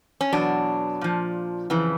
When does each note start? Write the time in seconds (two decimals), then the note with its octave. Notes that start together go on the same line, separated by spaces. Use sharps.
0.21 C#4
0.33 E2 B2 F#3 D4
1.01 A#2 F3
1.70 F2 C#3 E3